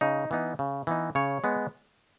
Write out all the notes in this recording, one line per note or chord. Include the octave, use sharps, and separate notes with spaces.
C#3 D#4
E3 B3 D#4
C#3
E3 B3 D#4
C#3 C#5
G#3 B3